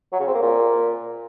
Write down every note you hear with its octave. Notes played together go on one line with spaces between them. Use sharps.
F#3
C#3
C4
A#3
A#2